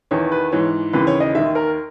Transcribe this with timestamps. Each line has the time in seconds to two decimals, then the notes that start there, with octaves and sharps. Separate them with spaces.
0.11 E2 D#3 C#5
0.32 B4
0.52 G#2 E3 C#5
0.93 D#2 C#3 E3 B4
1.07 C#5
1.20 D#5
1.35 D#2 D#3 E5
1.55 A#4